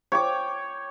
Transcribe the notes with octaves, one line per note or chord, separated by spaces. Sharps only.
C#5 G5 D6